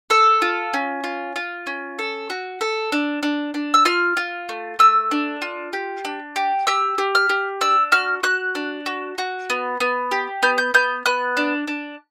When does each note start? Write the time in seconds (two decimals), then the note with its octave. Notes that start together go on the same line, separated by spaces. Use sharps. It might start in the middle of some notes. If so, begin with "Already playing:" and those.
0.10 A4 E6
0.42 F4
0.74 C#4
1.04 F4
1.36 F4
1.67 C#4
1.99 A4
2.30 F#4
2.61 A4
2.92 D4
3.23 D4
3.54 D4
3.74 E6
3.85 F4 F6
4.17 F4
4.49 A3
4.79 A3 E6
5.11 D4
5.42 F4
5.73 G4
6.05 D4
6.36 G4
6.67 G4 E6
6.98 G4
7.15 F6
7.29 G4
7.61 D4 E6
7.92 F#4 F6
8.23 F#4 F#6
8.55 D4
8.86 F#4
9.18 F#4
9.50 B3
9.80 B3
10.11 G4
10.43 B3 G6
10.58 G6
10.74 B3 G6
11.06 B3 F#6
11.37 D4
11.67 D4